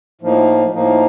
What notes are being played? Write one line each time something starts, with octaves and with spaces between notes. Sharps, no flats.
A2 F3 A#3 D#4
A2 F3 A#3 D#4